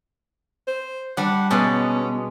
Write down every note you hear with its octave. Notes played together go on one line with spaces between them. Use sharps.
C5
G3 D4 F#5
B2 G#3 C#4 A5